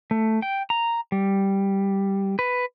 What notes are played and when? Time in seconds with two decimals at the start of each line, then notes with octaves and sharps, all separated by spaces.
0.11 A3
0.42 G5
0.70 A#5
1.12 G3
2.39 B4